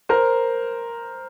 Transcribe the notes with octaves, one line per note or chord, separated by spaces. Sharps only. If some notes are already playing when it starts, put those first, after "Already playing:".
A#4 C5